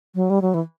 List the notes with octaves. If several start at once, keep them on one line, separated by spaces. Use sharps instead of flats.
F#3
G3
F#3
E3